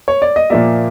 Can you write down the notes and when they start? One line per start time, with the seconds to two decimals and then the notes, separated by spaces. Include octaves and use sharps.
0.08 C#5
0.22 D5
0.36 D#5
0.50 A#2 F3 A#3 D5 E5